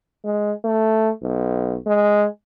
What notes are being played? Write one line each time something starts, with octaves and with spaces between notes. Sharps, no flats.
G#3
A3
B1
G#3